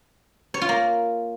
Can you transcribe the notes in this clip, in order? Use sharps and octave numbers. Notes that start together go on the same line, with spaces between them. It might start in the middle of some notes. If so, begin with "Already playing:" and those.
C#5
F4
A#3